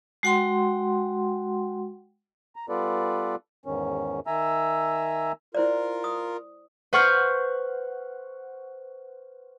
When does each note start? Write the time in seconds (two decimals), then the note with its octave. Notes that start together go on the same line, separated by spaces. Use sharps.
0.23 G#3 F#4 F#5 G5 C6
2.56 A#5
2.69 G3 B3 F4 A4 B4 D5
3.66 E2 G#2 D#3 C#4
4.27 D#3 E5 G#5 A#5 E6
5.55 E4 F4 A#4 C5 D5
6.04 D#6
6.93 B4 C5 F#5 C#6 F6 G6